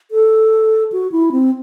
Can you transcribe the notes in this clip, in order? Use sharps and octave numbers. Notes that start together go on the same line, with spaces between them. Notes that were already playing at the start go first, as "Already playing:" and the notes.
A4
F#4
E4
C4